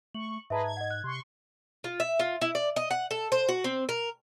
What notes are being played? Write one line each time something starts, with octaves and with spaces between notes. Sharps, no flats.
A3 C#6 F#7
G#2 G#4 B4 D#5 E5 A5 A#5
G#6
D#5 F#5
F#6
C3 C6 C#6
F4
E5
F4
E4
D5
D#5
F#5
A4
C5
F#4
C4
A#4